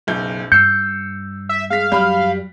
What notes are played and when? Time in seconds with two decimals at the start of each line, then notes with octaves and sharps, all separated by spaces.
0.07 F#1 B1 G6
0.52 G2 E6 G6 C7 C#7
1.49 E5
1.70 G#3 F5 B6
1.92 F#2 G3 B5 F6